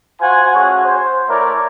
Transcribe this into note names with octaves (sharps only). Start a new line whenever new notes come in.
F4 F#4 C5 F#5 G#5
A3 C#4 F#4 G#4 C#5
C5
A3 E4 A#4 C#5 D5